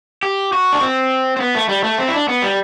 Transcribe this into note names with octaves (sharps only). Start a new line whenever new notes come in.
G4
F#4
D4
C4
C4
B3
A3
G3
A3
C4
E4
D4
B3
G3